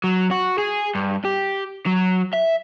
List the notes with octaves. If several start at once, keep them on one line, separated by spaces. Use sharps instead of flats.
F#3
F#4
G#4
G2
G4
F#3
E5